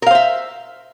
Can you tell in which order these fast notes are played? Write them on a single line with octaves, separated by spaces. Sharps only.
A#4 F5 C5 E5